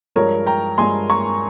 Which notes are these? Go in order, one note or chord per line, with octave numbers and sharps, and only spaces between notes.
G2 F3 G#3 A#4 C#5
G5 A#5
G2 F3 G#3 G#5 C6
A#5 C#6